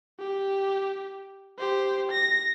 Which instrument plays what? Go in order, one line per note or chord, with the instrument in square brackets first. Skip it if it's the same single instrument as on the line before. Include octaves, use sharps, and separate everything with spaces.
[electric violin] G4
G4 C5
A#6